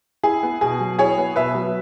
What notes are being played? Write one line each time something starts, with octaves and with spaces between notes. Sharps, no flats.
E4 G#4
B3
B2 G#4
F#3
E4 G#4 C#5
B3
B2 B4 E5
F#3